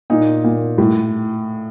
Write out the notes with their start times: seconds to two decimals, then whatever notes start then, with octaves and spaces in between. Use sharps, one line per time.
0.10 A#2 D#4
0.44 A#2
0.78 A2